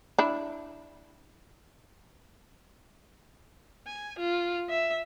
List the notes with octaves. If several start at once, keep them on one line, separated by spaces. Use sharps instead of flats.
D4 E4
G#5
F4
E5